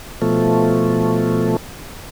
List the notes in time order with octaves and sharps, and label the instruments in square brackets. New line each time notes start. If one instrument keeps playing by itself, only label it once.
[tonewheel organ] B2 F3 A3